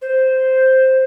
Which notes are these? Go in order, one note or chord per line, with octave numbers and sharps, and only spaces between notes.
C5